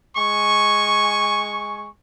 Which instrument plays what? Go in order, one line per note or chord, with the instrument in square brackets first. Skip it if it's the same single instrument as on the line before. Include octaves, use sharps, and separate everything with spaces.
[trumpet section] G#3 G#5 C#6